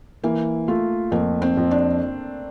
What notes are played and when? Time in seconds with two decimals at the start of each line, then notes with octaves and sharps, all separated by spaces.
0.24 E3 A#3
0.68 A3 F4
1.12 F2 A#3
1.42 C4
1.57 F2
1.71 D4